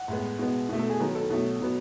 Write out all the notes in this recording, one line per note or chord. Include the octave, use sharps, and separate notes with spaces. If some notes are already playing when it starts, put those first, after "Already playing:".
Already playing: F#5
A2 G#3 B3
B2 G#3 B3
B2 A3
A4
G#4
D#3 F#3 B3
A4
B2 F#3 A3
B2 F#3 B3